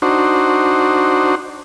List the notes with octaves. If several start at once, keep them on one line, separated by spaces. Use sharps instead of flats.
D4 D#4 F#4 C5